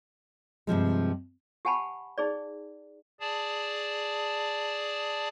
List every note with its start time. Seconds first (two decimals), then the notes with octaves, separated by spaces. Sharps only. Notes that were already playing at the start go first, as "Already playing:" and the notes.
0.67 G2 C3 F3 G#3
1.65 G4 F#5 G#5 A5 B5
2.18 D#4 G#4 D5
3.20 G#4 D5 A5